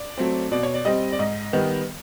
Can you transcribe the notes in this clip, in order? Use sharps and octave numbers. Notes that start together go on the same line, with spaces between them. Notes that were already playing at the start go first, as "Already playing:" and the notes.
Already playing: D5
F#3 A3 C4
B2 D5
C#5
D5
G3 C4 D#5
D5
G#2 D#5
D#3 G3 B3